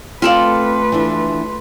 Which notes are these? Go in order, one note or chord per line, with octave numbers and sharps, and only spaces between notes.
A3 C4 F4 A4 B4 D5 F5 C6
E3 D4